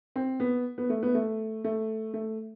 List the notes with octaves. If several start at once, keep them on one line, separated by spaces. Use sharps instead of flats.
C4
B3
B3
A3
B3
A3
A3
A3